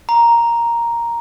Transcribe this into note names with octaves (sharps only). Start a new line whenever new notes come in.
A#5